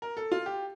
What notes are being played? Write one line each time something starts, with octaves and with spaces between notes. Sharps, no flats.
A#4
A4
F4
G4